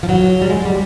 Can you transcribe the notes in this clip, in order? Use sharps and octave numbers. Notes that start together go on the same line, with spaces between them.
F3
F#3
G3
G#3
G3